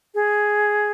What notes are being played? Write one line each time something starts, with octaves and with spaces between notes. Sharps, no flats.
G#4